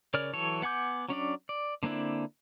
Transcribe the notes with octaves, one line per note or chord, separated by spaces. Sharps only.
C#3 A#4 C#5 D5 F6
E3 F#3 A4 C#5
B3 F#5 G#5 D6 G6
F#3 C#4 D4 D5
D5
D3 A#3 C4 D4 E4